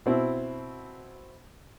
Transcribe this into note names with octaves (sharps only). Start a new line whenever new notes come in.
B2 C4 E4